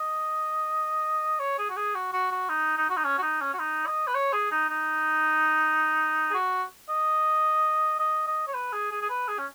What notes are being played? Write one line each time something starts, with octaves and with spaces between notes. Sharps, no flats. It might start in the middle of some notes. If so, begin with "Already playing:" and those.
Already playing: D#5
C#5
G#4
F#4
G#4
F#4
F#4
F#4
D#4
D#4
F#4
D#4
C#4
F#4
D#4
C#4
F#4
D#4
D#5
B4
C#5
G#4
D#4
D#4
G#4
F#4
D#5
D#5
D#5
C#5
B4
G#4
G#4
G#4
B4
G#4
C#4